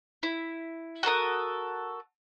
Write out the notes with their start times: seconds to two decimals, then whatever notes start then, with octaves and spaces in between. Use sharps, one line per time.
0.23 E4
1.03 F#4 A4 A#4 D#6